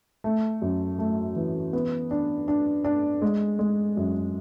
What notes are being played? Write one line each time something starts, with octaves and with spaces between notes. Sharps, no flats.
A3
F#2
A3
E3
B3
D4
D4
D4
G#3
G#3
F#2